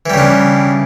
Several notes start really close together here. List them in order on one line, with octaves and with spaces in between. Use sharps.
E3 G3 C#3 D4